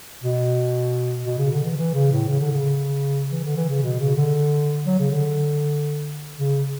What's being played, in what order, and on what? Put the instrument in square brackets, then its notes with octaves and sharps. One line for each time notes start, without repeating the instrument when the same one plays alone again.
[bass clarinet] B2
B2
C#3
D3
E3
E3
C#3
A2
C#3
D3
C#3
E3
D3
E3
C#3
B2
C#3
D3
F#3
C#3
D3
C#3